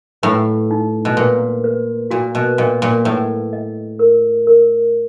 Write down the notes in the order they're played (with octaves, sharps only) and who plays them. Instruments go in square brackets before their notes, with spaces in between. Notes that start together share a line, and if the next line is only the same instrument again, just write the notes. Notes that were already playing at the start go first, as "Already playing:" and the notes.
[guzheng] A2 [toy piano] B4
[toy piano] D#4
[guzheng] B2
[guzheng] A#2 [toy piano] B4
[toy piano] B4
[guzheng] A#2 [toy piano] F#4
[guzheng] B2
[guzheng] A#2 [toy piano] D#5
[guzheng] A#2
[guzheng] A2 [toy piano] B4
[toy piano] D#5
A#4
A#4